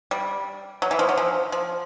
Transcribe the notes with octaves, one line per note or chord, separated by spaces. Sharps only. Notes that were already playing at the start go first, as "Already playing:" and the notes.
G3
F#3
E3
F3
F#3
F3
F3